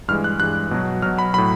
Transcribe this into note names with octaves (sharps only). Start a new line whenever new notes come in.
G2 E3 G#3 F6
F#6
G2 E3 G#3 F#6
B2 F#3
B2 F#3 F6
B5
A2 F#3 B5